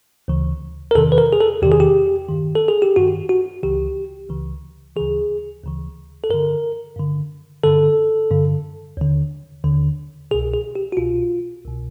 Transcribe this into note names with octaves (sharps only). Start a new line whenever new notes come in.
D2 C#3 E3
A#4
E2 C3 D#3 A4
B4
A#4
G#4
A4
E2 C3 D#3 G4
G#4
G4
G2 D#3
A4
G#4
G4
G2 D#3 F#4
F#4
C#2 C#3 E3 G4
C#2 C#3 E3
D2 C#3 E3 G#4
D2 C#3 E3
A4
G2 D3 A#4
G2 D3
G2 D3 A4
G2 D3
D#2 D3
D#2 D3
C2 B2 G#4
G#4
G4
F#4
C2 B2 F4
C2 B2